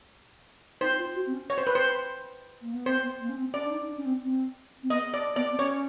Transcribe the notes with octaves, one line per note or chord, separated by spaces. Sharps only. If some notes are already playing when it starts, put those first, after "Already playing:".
D#4 C5
F4
F#4
C4
C#4
C#5
C5
B4
C5
A#3
B3
C4 C5
B3
A#3
C#4
C4
C#4 D5
D4
D#4
D4
C#4
C4
C4
C4
B3 D#5
D5
B3 D5
C4
C#4 C#5